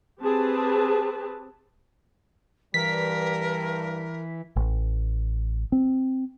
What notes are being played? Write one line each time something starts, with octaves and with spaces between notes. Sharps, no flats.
C4 G4 G#4 B4 A5
G2 E3 G3 A#4 B6
A1
C4